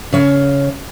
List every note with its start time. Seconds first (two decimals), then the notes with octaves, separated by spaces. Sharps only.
0.13 C#3 C#5 F5